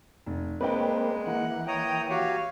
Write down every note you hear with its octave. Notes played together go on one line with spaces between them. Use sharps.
F1
G#3 A#3 C4 B4 D5 G5
E3 A#3 F#5
C#5 G5 A#5 D#6
F#4 G4 C#5 F5